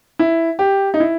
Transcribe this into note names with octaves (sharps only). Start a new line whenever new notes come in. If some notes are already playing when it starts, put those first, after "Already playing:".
E4
G4
D#4
E4